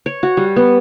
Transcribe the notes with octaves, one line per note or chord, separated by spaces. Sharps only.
C#5
F#4
G3
B3